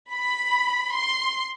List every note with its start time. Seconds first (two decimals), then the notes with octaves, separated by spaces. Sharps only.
0.12 B5
0.95 C6